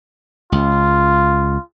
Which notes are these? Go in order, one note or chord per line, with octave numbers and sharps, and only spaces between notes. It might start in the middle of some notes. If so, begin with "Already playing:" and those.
C#2 F4